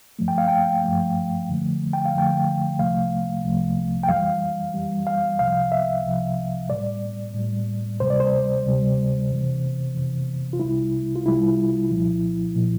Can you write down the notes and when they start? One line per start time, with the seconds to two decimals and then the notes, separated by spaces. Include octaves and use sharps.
0.19 G2 F3 A3
0.28 G5
0.38 F5
0.48 G5
0.84 G2 F3 A3
1.49 F2 D3 F3 A3
1.93 G5
2.05 F5
2.14 F2 D3 F3 A3 G5
2.79 C2 C3 F3 A3 F5
3.44 C2 C3 F3 A3
4.03 G5
4.09 F2 E3 G3 F5
4.74 F2 E3 G3
5.07 F5
5.39 C2 C3 F3 F5
5.72 E5
6.04 C2 C3 F3
6.69 A2 G3 D5
7.34 A2 G3
7.99 D2 C3 G3 C5
8.10 D5
8.20 C5
8.64 D2 C3 G3
9.30 F2 C3 E3
9.95 F2 C3 E3
10.53 F4
10.60 C2 C3 G3 E4
11.15 F4
11.25 C2 C3 G3 E4
11.90 C2 A#2 F3
12.56 A#2 F3